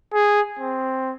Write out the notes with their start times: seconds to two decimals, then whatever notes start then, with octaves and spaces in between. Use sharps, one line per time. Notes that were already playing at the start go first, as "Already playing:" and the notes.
0.14 G#4
0.59 C4